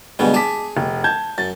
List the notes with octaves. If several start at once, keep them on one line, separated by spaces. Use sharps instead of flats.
D2 G2 B2 G#3
G#4 A5 D6 B6
F1
A5 G6 G#6
F#2 A6